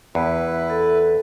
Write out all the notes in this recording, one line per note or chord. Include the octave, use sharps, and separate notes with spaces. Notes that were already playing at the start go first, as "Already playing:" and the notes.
E2 E4 B4
A4